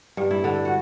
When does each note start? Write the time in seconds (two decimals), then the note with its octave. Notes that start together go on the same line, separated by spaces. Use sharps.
0.17 G2
0.31 E4
0.44 D3
0.65 F#4